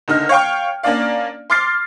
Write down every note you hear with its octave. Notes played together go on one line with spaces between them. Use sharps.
F#1 D3 D#4 F6
C#5 F5 G5 C#6
A#3 C#4 D4 D5 F5
C6 D6 F6 A6 C7